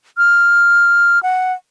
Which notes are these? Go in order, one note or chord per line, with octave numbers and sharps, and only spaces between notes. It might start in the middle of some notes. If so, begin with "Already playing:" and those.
F6
F#5